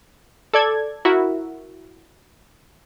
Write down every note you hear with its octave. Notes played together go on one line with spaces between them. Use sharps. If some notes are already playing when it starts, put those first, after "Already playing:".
A4 D5 G#6
E4 F#4 A#4 E5